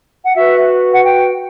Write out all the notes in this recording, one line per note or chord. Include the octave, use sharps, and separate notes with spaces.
F#5
F#4 B4 E5
F#5
G5